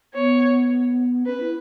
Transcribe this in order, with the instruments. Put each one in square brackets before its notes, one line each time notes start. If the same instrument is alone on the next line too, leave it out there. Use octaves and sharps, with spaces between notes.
[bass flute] B3 [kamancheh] C#5
[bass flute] C#4 [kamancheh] B4
[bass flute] E4